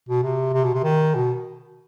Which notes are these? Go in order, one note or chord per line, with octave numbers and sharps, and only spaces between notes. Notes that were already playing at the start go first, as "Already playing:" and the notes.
B2
C3
C3
B2
C3
D#3
B2